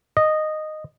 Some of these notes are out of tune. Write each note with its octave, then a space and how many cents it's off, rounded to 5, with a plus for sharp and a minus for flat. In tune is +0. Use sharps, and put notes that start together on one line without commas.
D#5 -10